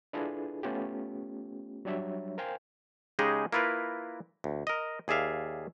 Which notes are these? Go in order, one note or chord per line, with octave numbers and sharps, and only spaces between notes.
D4 E4 F4 G#4 A4 B4
A3 B3 C#4 F4 G4
F#3 G3 D4 C#5 E5
A#4 C5 F5 G5 G#5
C#3 G#3 D#4 G4 G#4 D#5
A#3 E4 F4 A#4 B4
D2
A#4 D#5
D#2 G#4 D5 E5 F5